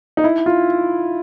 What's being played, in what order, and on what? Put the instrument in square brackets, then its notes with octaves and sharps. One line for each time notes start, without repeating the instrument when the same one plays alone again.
[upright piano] D#4
E4
F4